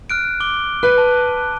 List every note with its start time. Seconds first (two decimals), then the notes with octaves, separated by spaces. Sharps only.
0.10 F6 F#6 D7
0.40 D6 G7
0.83 B4 F#6
0.98 A5